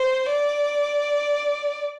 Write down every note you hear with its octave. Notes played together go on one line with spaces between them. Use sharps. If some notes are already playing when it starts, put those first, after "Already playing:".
Already playing: C5
D5